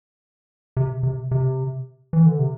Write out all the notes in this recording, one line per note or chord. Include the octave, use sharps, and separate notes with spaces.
C3
C3
C3
E3
D3
C3